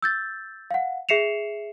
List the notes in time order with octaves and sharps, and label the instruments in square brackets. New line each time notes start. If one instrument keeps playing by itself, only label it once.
[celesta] E6 G6 A6
F5 F#5
G#4 E5 C7 C#7 E7 F7